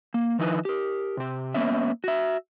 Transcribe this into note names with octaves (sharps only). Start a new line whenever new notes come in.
A#3
D#3 F3 D#4 E4 B4
G4 A#4
C3 G4
A#3 B3 C#4 E5
F#4 E5